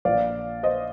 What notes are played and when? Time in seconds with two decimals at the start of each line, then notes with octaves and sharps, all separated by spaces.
0.05 A#1 A#2 F3 D5 F5
0.63 C5 D#5